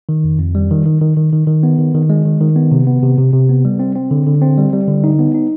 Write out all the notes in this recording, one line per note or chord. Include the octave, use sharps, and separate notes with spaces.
D#3
F2
F2
G3
D#3
D#3
D#3
D#3
D#3
D#3
B3
D#3
D#3
G#3
D#3
D#3
B3
C3
B3
C3
C3
C3
B3
G3
C4
C4
D3
D3
C4
G3
G3
D3
D#4
B3
D#4